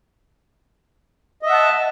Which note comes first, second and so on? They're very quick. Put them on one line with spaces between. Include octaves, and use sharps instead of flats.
D#5 E5 F#5 A5